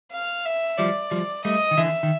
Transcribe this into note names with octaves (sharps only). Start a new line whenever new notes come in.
F5
E5
F3 G3 D5
F3 G3
G3 A3 D#5
D#3
D3 E3 E5
D#3